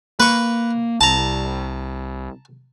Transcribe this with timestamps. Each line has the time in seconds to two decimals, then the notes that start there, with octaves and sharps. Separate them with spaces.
0.20 A#3 B4 C#6
1.01 C2 A5 A#5